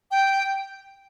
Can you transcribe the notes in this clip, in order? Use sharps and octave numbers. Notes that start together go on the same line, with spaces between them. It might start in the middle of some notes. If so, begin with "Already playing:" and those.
G5